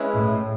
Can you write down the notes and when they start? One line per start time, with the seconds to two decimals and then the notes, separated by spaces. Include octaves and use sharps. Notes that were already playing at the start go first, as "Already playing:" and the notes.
Already playing: G#3 C#4 E4 B4
0.13 A2